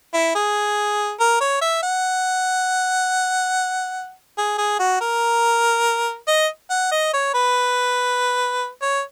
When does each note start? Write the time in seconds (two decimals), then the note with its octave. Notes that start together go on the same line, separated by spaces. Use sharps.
0.14 E4
0.35 G#4
1.20 A#4
1.41 C#5
1.62 E5
1.83 F#5
4.38 G#4
4.58 G#4
4.80 F#4
5.01 A#4
6.28 D#5
6.70 F#5
6.92 D#5
7.13 C#5
7.34 B4
8.82 C#5